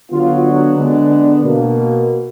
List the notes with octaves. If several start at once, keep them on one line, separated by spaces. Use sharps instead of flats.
D3 F#3 B3 F4
D4
D3 G#3 B3
B2 A#3